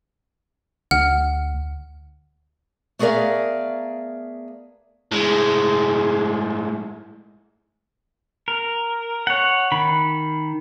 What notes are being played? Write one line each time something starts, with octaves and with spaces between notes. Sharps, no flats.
D2 F#5 F6
A3 B3 G#4 A#4 D5 F5
A2 G#3
A#4
C#5 F#5
D#3 B5